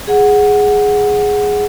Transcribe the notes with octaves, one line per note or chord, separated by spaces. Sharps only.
G#4 F#5